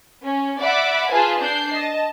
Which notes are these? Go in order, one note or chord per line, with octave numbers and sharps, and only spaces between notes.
C#4
D5 E5 F#5 B5 D6
F4 G#4 B4 G#5 A5
D4 G6 C7
D#5 A5